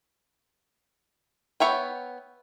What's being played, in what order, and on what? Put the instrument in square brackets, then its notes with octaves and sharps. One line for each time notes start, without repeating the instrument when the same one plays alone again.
[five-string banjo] B3 C#5 E5 G5